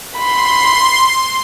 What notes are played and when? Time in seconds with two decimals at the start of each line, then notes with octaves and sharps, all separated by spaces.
0.17 B5 C6